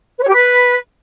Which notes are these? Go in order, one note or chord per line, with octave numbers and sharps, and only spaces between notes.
B4
C#5
G4
B4